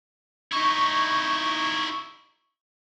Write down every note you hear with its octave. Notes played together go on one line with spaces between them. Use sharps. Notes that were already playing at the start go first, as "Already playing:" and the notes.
D#4 E4 C#6